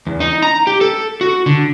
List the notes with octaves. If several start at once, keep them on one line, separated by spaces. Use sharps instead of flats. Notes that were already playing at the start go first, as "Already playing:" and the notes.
E2
D#4
A#5
G4
A4
F#4
D3